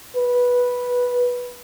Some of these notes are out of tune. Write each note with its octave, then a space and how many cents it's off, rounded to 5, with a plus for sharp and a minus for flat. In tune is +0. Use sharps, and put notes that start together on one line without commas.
B4 -10